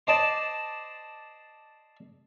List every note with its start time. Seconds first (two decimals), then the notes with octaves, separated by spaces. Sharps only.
0.07 C5 D5 D#5 A5